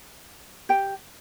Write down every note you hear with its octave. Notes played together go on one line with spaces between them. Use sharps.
G4 G5